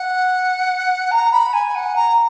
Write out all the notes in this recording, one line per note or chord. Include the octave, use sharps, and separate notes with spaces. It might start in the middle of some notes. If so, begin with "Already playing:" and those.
Already playing: F#5
A#5
B5
G#5
F#5
A#5